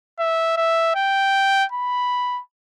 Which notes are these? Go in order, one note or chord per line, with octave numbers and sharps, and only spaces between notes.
E5
E5
G5
B5